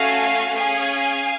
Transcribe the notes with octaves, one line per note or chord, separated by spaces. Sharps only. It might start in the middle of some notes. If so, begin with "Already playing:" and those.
Already playing: A3 C#4 F#4 F5 G#5
C#4 G#4 F5 G#5